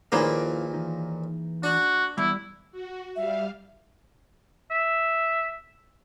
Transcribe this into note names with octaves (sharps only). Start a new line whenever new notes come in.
D#2 A#2 F3 A#3 E4 G#4 B4 F5
E3 D#4
D4 F#4
E2 G3 E4 D5
F#4
G3 E5 F5
E5